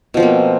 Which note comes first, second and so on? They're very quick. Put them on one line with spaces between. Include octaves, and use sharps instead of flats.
B2 F3 C4 A#3